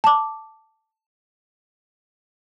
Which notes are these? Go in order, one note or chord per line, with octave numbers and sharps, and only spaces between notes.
A5 D6